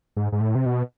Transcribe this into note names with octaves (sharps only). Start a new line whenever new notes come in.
G#2
G#2
A2
C3
B2